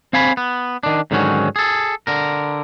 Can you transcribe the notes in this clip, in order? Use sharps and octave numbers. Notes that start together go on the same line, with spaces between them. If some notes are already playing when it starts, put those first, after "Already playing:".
C4 F5 G#5 B5
B3
D#3 D4
G#2 D3 D#3 F#3 C#4
G#4 A4
D3 A#4